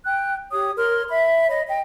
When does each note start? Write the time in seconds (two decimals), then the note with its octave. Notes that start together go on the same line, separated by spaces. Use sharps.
0.05 G5 F#6
0.50 G4 C#5 D#6
0.77 A#4 C#5 C6 F6
1.08 E5 B5
1.48 C#5 D#5 B5
1.66 D#5 G5